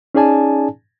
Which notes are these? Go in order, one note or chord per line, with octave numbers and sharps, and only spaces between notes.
C#4 D#4 G#4 D5 G#5 A5